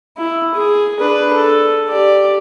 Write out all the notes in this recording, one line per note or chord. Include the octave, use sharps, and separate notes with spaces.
E4
G#4
D4 B4
A4
G4 D5